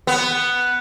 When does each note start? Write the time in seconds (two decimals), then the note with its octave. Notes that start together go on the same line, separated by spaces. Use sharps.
0.07 B3